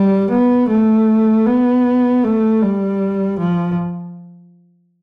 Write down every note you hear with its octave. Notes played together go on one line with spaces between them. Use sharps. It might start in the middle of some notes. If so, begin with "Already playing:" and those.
Already playing: G3
B3
A3
B3
A3
G3
F3